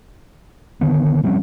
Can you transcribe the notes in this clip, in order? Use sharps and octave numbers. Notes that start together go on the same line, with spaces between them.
D3 D#3 B3
F3 G3 C4 C#4